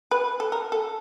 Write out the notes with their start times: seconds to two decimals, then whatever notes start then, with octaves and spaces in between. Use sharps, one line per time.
0.11 B4
0.40 A4
0.52 A#4
0.72 A4